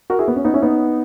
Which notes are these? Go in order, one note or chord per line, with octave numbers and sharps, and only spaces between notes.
F#4 A#4
E4 G#4
B3
C#4
B3 D#4
C#4 E4
B3 D#4